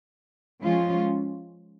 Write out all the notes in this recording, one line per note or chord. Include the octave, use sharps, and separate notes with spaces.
F3 G#3 C#4 F4